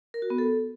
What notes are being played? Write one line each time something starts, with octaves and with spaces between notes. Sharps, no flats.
A#4
F#4
B3
A4